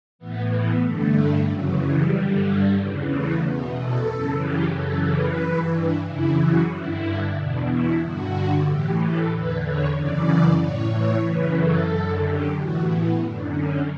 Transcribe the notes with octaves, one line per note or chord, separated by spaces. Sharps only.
A2 E3 B3
B3
G2 D3 A3
F#2 C#3 E3 F#3
G3
G2 D3
E2 C#3 E3
A3
E2 B2 B3
A4
F#2 C#3 E3
G4
F#2 C#3 E3 A4
B4
G2 E3
D4
F#2 C#3 E3 E4
F#4
G2 D3 E4
E2 B2 D4
E4
G2 D3 F#4
A2 E3 G4
A4
E2 D3 B4
C#5
F#2 C#3 E3 D5
A2 E3 C#5
C#5
F#2 C#3 E3 B4
A4
F#2 D3
G4
A2 E3 F#4
B3
F#2 D3
C#4